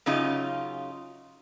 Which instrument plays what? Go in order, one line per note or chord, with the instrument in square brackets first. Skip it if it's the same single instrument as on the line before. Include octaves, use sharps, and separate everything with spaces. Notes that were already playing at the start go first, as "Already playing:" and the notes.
[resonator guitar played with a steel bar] F#2 C#3 D#4 F4